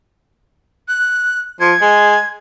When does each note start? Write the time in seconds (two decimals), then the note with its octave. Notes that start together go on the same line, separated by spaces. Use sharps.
0.88 F#6
1.60 F3 G#6
1.81 G#3